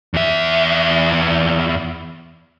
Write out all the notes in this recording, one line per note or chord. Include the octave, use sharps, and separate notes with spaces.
E2 E5